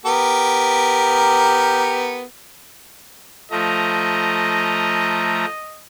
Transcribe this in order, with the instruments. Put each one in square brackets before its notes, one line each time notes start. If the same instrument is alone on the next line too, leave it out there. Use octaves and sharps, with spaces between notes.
[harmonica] B3 G4 A#4
[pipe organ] F3 A3 A#5 [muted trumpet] D#5